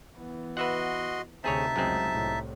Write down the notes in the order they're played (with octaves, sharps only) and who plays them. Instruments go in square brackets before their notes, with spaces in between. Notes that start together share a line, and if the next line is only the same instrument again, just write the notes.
[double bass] E3 B3
[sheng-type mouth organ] F#4 D#5 C6 [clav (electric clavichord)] B4 E5 F#5
[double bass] D2 C3 [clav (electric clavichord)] C4 G#4 C#5 [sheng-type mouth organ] D#4 E5 A5
[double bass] F1 C#2 [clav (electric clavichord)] F#2 G#3 C4
[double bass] C2 A2